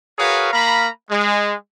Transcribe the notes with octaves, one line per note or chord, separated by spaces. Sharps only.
F#4 G#4 A#4 B4 C#5 F5
A#3 F5 A#5 B5
G#3